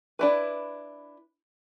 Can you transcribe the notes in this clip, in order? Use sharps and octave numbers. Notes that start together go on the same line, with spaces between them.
D4 E4 B4